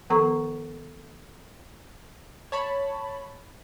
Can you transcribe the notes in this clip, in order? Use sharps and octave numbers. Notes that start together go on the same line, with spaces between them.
D#3 F3 B3 A4 A#5 C#6
C#5 A5 B5